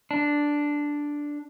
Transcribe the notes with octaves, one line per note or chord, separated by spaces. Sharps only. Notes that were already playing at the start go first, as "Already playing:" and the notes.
D4